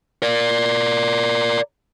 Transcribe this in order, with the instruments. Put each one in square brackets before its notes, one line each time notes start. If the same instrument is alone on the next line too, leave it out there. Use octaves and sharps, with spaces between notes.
[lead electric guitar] A#4 D5